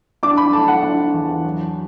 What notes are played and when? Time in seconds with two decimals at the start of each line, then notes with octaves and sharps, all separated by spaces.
0.23 D4 D6
0.37 B5
0.53 A3 A5
0.68 F#5
0.83 D4
1.14 E2
1.44 F#3